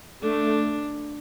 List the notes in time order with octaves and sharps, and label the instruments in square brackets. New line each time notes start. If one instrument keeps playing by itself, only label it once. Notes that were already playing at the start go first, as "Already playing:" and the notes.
[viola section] A3 [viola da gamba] D4